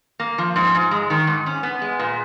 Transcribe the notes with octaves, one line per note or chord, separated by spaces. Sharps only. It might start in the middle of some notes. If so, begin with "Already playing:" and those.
A#3
F3
G#2
G#2
G#3
D#3
G#2
C#4
B3
G#3
A#2